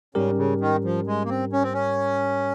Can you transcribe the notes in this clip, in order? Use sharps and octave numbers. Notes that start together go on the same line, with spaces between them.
G#2 C#3 G3 C#4 G4 A#4
C#3
D#3
F3
G#3
A#3
C4
C#4
C4
C#4